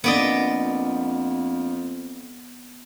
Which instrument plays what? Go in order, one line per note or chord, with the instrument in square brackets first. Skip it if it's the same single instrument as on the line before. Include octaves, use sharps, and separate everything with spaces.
[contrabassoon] F2 [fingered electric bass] A#3 D4 [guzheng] B3 D5 D#5